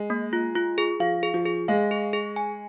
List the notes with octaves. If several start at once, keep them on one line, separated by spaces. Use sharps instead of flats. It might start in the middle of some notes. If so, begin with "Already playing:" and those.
Already playing: G#3
A#3
F4
F4
G#4
F3 F5
G#4
F3
G#4
G#3 F5
G#4
G#4
G#5